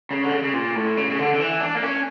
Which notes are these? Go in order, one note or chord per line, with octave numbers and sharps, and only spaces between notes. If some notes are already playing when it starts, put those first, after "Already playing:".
C#3
D3
C#3
C#3
A#2
A2
C#3
C#3
D3
D3
E3
D4
A#3
C#4